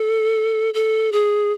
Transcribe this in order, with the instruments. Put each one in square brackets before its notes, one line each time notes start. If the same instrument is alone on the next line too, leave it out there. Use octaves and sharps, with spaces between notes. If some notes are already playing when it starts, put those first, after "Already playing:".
Already playing: [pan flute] A4
A4
G#4